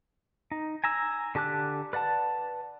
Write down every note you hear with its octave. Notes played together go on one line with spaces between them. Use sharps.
D#4
G#5 A#5 E6
D3 G4 A5 D6 F#6
B4 D5 F#5 A5